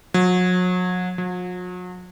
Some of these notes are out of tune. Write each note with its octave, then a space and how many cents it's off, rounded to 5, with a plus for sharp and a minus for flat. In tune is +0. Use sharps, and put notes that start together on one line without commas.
F#3 -35
F#3 -45